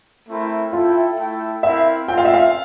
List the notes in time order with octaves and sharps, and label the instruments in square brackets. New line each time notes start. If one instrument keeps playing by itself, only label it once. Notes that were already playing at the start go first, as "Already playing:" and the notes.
[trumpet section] A3 C4 E4 A#4
[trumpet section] E4 A4 E5 G5 [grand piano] F4
[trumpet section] A3 E4 A4 E5 G5
[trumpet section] C4 E4 A#4 F5 [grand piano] E5
[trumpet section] A3 C4 F4 [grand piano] G5
[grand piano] F5
E5
F5